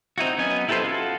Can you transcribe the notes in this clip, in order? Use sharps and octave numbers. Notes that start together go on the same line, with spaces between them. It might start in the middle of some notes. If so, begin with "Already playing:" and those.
C4 D#4 E4 F#4
F#3 B3 C#4 D#5 G#5
E4 G4 A4 B4 C5
F4 F#4 A4